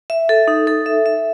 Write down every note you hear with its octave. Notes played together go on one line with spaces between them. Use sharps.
E5
A4
D#4
A4
E5
E5